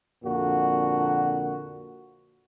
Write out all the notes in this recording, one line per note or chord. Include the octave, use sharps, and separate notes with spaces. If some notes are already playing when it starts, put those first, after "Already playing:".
F2 A#2 D3 A#3 F#4